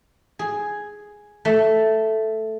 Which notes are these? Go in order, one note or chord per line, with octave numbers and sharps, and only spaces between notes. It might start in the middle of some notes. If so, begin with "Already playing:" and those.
G#4
A3